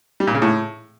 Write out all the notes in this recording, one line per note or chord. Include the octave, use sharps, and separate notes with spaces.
G3
A#2
C#3
A2